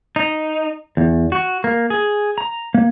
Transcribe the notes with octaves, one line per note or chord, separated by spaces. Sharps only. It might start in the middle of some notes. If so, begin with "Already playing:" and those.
D#4
E2
F#4
A#3
G#4
A#5
A#3